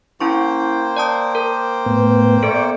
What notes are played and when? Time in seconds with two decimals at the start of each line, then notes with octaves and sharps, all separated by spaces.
0.20 A#3 C#4 E4 C5 G5 C#6
0.96 D5 A5 D#6
1.35 A#4
1.86 A2 B3
2.43 B3 A4 D5 C#6